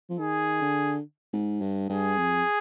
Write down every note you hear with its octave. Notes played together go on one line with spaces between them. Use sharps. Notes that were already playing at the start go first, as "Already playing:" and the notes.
F3
D#3 G#4
D3
G#2
G2
G2 G#4
F2